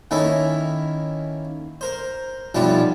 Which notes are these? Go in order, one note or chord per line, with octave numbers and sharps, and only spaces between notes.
D#3 A#3 C#4 E4 A4
A#4 C5
B1 E3 F3 G3 F4 A5